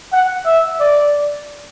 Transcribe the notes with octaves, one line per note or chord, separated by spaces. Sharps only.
F#5
E5
D5